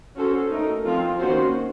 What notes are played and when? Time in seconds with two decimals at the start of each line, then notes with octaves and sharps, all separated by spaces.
0.16 C#4 F#4 A4 C5
0.50 A3 D#4 A#4
0.85 F3 C4 F4
1.18 D#3 A#3 C#4 F#4 C5